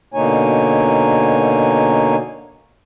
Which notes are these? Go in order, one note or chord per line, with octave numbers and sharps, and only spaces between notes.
B2 D3 A#3 D#4 C#5 G#5